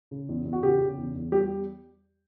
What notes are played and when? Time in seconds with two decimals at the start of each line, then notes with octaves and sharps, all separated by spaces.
0.11 C#3
0.29 E2
0.45 E2
0.53 F#4
0.63 C#3 G4
0.80 C#3
0.98 E2
1.16 E2
1.32 G3 G4